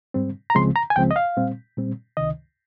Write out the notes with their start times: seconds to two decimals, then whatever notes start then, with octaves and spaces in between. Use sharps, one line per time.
0.14 G#2 G3 C4
0.50 A#5
0.55 C#2 C#3 F3 G#3 C4 C6
0.76 A#5
0.90 G#5
0.96 C#2 C#3 F3 G#3 C4 G5
1.11 D#5
1.16 F5
1.37 A#2 G3 C4
1.77 A#2 G3 C4
2.17 C#2 C3 D#3 D#5